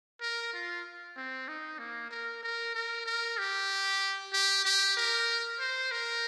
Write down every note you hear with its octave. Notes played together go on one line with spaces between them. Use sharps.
A#4
F4
C4
D#4
A#3
A#4
A#4
A#4
A#4
G4
G4
G4
A#4
C5
A#4